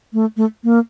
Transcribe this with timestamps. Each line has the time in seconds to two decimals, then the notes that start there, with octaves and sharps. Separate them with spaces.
0.13 A3
0.37 A3
0.64 A#3